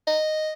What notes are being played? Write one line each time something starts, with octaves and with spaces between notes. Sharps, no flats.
D#5